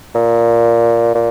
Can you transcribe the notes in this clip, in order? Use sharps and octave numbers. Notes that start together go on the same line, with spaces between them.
A#2
A#2